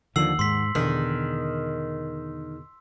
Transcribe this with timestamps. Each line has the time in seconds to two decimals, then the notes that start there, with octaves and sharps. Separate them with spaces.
0.16 D#2 D3 D#3 F3 F#5 E6 C7 F#7
0.39 G#2 C6 B6
0.75 E2 B2 D3 D#3 G#4